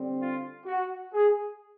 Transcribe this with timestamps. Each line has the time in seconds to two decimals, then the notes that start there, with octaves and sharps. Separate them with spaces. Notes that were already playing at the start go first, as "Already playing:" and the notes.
Already playing: D3 G3 C4
0.20 F4
0.66 F#4
1.13 G#4